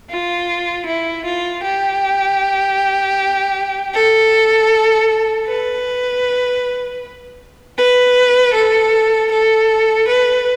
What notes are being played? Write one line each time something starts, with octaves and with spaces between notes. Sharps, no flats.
F4
E4
F4
G4
A4
B4
B4
A4
A4
B4